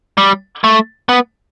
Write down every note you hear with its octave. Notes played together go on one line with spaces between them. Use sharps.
G3
A3
B3